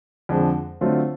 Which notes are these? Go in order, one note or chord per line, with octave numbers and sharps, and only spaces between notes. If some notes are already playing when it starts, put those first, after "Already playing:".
F2 D3 F3 G#3
D3 F#3 A3 C4 F4